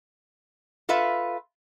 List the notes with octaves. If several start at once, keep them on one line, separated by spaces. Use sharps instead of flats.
F4 A4 B4 E5 F5